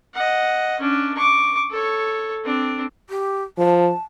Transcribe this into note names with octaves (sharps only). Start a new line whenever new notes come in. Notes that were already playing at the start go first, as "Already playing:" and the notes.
D#5 F#5
C#4 D4
C#6 D6
A4 C#5
C4 D4
G4
F3 A5